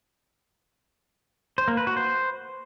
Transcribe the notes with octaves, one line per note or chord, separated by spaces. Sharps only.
C5
A#3
B4
F#4
C5